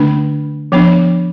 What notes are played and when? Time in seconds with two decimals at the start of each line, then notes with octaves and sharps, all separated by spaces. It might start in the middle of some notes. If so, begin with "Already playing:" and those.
Already playing: D3 A3 D4
0.72 F3 B3 D4